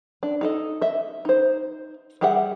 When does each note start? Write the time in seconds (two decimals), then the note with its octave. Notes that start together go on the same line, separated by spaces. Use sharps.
0.23 D4
0.41 D#4 A4 D#5
0.82 D#5 E5
1.25 D#4 C5
2.21 G3 G4 G#4 E5 F#5